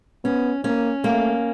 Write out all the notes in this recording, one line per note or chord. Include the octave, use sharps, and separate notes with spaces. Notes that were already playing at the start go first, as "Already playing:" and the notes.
B3 C#4
A#3 C#4
A3 A#3